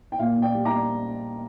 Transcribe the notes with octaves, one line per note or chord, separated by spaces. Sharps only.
G5
A#2 F5
A#2
D5 G5
G3
A#5 D6
D4